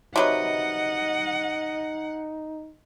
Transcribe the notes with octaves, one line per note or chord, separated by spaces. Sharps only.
C3 F#3 D#4 B4 D#5 F#5